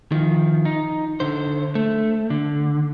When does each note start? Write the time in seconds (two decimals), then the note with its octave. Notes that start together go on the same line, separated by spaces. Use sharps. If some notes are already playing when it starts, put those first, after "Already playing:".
0.12 D#3 F3
0.65 D#4
1.20 D3 C5
1.75 A3
2.30 D3